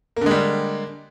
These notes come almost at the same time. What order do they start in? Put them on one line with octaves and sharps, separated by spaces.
A#3 D3 G#3 G3